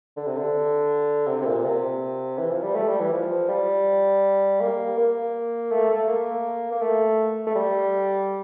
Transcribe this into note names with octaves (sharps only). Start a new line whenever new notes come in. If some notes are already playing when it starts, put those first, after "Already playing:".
D3
C3
D3
C3
C3
A#2
C3
E3
F3
G3
A3
G3
E3
F3
G3
A#3
A#3
A3
A3
A#3
A#3
A3
A3
G3